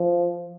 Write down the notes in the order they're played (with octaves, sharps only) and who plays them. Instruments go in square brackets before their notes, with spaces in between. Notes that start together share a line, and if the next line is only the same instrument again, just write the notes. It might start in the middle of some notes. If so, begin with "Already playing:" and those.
Already playing: [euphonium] F3